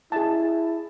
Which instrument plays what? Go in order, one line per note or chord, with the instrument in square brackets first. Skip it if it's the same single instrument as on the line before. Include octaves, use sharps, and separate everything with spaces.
[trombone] E4 [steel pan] G#4 A5